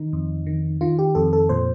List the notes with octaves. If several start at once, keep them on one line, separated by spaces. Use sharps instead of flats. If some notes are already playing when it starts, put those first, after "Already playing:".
Already playing: D#3 D#4
F2
D#3
D#3 F4
G4
F2 A4
A4
A#2 C5